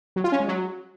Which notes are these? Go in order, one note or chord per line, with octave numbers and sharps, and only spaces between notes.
F#3
F4
C#4
G#3
F#3